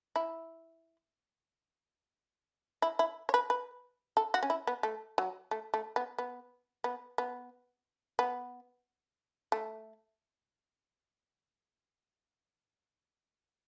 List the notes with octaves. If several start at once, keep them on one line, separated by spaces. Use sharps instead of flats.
E4
E4
E4
C#5
B4
B4
A4
F#4
C#4
E4
B3
A3
F#3
A3
A3
B3
B3
B3
B3
B3
A3